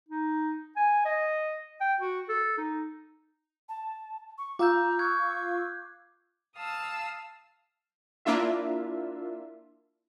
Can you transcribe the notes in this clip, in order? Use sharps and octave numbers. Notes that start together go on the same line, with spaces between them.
D#4
G#5
D#5
G5
F#4
A4
D#4
A5
C#6
F4 F5 A#5 D6 E6 G6
C#6 F#6 G#6
F5 A5 D#6 E6
A#3 D4 E4 F4 E5